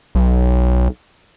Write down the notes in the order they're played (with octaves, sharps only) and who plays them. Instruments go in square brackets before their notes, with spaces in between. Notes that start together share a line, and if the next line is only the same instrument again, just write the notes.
[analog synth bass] B1